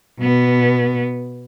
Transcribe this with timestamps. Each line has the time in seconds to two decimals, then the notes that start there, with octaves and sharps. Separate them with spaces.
0.20 B2 B3